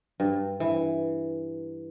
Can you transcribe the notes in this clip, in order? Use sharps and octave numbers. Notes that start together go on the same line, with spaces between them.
G2
E3